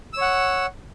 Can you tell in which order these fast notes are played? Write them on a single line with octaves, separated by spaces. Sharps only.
E6 C#5 F#5